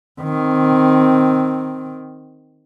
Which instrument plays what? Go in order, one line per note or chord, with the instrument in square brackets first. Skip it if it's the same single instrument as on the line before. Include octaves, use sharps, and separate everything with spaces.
[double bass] D#3 C4